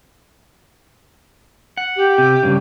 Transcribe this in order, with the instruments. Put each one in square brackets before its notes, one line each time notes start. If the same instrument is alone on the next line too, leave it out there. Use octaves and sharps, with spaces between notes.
[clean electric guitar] F#5
[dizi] G4
[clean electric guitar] C3
G2 C#3